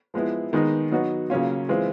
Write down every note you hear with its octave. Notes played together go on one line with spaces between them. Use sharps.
F3 G#3 B3 E4
D#3 G#3 B3 D#4
F#3 B3 D#4 F#4
C#3 F#3 A#3 C#4 F4
E3 G#3 C4 F4